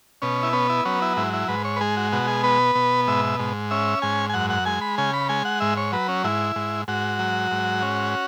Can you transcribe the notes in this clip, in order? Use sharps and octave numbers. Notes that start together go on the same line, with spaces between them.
B2 C#4
E4
B3 C#4
E4
F#3 C#4
E4
G#2 E4
E4
G#2 B4
C#5
B4
G#3 G#4
F#4
B2 F#4
G#4
B3 B4
B2
G#2 E5
G#2
C#4 E5
G#2 G#5
G#5
F#2 F#5
F#5
G#3 G#5
B5
C#3 G#5
B5
G#3 G#5
F#5
G#2 E5
C#5
F#3 B4
C#4
G#2 E4
G#2
G#2 F#4
F#3
G#2
C#4